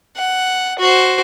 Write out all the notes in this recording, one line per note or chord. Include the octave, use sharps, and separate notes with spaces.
F#5
F#4 C5